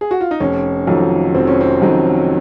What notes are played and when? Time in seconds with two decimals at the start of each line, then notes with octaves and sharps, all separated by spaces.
0.01 G#4
0.11 F#4
0.21 F4
0.31 D#4
0.40 F1 C#4
0.87 F2 D#3 F#3
1.35 F1 C4
1.47 C#4
1.61 C4
1.82 F2 D#3 F#3